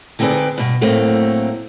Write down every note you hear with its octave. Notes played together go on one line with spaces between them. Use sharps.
D3 C4 D#4 G#4 B4 D5
G2 B2
A2 F#3 A3 A#3 C4